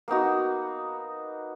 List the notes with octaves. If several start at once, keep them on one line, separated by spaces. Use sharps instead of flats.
A#3 B3 D#4 F#4